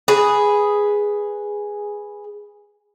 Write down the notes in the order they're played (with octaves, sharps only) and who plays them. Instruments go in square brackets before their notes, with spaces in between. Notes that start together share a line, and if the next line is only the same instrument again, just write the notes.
[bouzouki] G#4 B4